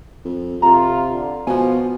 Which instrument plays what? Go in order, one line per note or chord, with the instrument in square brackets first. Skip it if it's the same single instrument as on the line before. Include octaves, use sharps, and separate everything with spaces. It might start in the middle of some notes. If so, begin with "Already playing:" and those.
[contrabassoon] F2
[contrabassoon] C3 [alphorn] F4 [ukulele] A4 A#5
[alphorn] D3
[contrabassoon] B2 [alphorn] F3 [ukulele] F#4 G#5